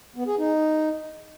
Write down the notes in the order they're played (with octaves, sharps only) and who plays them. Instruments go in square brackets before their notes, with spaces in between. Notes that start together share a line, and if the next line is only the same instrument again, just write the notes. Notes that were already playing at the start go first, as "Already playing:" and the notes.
[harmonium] B3
G#4
D#4